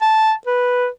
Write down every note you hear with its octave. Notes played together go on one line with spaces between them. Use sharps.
A5
B4